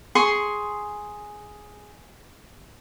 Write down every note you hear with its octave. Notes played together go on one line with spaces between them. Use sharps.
G#4 C6 C#6